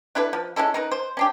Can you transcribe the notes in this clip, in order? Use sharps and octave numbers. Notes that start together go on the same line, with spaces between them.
D4 E4 A4 B4
F3
G#3 C#4 E4 A4
D#4 A#4 B4
C5
C#4 D4 G4